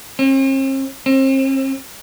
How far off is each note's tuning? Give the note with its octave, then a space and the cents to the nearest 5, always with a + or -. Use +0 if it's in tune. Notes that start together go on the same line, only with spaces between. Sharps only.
C4 +45
C4 +40